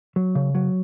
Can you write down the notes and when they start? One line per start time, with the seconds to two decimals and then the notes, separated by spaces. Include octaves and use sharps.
0.16 F#3
0.35 C#3
0.55 F#3